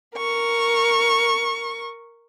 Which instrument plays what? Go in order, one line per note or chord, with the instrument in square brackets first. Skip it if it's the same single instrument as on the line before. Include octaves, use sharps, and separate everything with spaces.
[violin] A#4 C#6